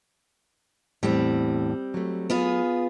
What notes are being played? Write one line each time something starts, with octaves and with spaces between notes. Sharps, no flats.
E2 A2 G3 C4
F#3 A3
B3 F4 G#4